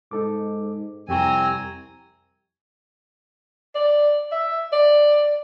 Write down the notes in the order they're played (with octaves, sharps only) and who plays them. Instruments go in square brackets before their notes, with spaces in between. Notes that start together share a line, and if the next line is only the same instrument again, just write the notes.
[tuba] G#2 [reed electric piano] D#4 A4 D6
[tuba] C2 [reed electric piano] F2 G4 C#6 [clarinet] C4 [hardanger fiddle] G#5 A#5
[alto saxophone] D5
E5
D5